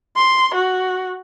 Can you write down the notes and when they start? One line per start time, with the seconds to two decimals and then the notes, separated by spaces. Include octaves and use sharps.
0.16 C6
0.54 F#4